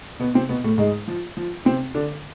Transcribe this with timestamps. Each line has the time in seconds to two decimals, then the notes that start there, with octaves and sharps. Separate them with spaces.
0.20 B2 B3
0.34 C3 C4
0.49 B2 B3
0.64 A2 A3
0.78 G#2 G#3
1.08 F3
1.37 F3
1.65 C3 C4
1.94 D3 D4